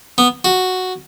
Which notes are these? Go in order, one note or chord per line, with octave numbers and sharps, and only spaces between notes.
B3
F#4